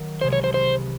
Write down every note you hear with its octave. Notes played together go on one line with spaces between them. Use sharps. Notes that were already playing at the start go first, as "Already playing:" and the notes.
Already playing: D#3 F#3
C2 C3 E3 G#3 C5
C#5
C5
C5